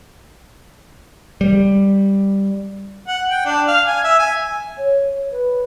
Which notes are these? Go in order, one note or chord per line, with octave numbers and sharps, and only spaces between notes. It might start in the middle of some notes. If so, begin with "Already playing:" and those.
G3
F#5
G5
D4
F5
G#5
E5
G#5
C#5
B4